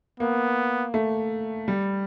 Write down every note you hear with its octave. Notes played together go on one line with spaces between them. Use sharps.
A#3 B3
A3
G3